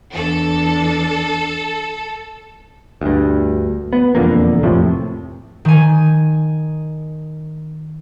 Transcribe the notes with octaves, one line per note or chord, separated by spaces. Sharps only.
E2 D4 A4
D2 G2
B3
E1 F2 D3 A#3
F2 A2 C3 F3
D#3 G#5